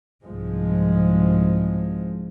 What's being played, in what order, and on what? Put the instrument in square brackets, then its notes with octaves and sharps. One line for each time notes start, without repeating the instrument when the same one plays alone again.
[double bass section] C2 G#2 F3 G#3